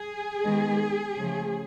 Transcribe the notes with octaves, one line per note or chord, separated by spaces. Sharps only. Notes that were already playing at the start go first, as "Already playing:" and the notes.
Already playing: G#4
D#3 G#3 B3
C#3 F3 A3